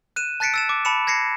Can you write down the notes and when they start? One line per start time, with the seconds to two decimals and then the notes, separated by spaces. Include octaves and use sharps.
0.16 F#6 D#7 E7
0.40 A5 F#6 A6 B6 C#7 D7
0.54 E6 A6 E7
0.69 D6
0.85 A5 B5 C#7 E7
1.07 G#6 A#6 C7 C#7